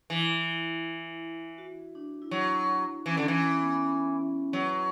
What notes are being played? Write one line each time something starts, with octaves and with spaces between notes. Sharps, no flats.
E3 E4
F#4
D4
E4
F#3 D4
E3 C#4
D3
E3 C#4
B3
C#4
F#3 B4